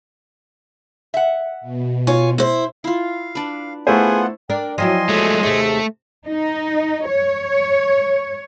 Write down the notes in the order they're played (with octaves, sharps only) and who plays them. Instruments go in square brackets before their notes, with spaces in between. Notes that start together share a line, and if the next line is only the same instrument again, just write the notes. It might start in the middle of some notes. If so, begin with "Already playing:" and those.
[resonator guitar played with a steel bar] E5 F#5
[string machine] B2
[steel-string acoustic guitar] F4 C#5 G#5
E4 C5
[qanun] E4 F4 [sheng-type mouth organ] F5
[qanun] D4 B4
[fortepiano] A3 E4 C5 [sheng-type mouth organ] B3 F4 F#5 [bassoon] G#4
[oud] D4 A#4 D5 [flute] G5
[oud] F3 F#3 E4 [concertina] D#5 G#5 C6 [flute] G5
[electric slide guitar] G#3 A3 [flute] A4
[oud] D#2 C3 [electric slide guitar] A3 [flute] G#4
[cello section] D#4
C#5